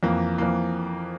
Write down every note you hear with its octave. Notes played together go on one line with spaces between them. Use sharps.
F2 E3 A#3
F2 E3 A#3